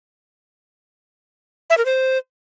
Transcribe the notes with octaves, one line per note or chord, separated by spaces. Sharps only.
E5
A#4
C5